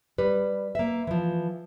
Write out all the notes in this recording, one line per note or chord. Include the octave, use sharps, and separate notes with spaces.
G3 B4
A#3 E5
E3 F3